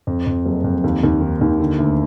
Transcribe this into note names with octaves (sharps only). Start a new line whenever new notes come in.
F2
F2
F#1
F2
D#2
D#2
D#3
D#2
D3
D2